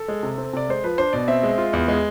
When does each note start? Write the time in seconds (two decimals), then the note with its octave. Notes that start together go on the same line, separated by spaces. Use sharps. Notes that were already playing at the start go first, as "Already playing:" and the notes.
Already playing: A4
0.08 G#3
0.23 C3
0.38 C4
0.53 C3 D5
0.69 G#3 C5
0.84 F3 B4
0.98 D4 C5
1.13 B2 D5
1.28 C4 E5
1.43 G#3
1.58 F4
1.73 E2
1.88 G#3